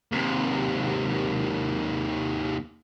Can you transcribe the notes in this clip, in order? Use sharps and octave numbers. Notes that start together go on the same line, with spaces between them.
D#2 C3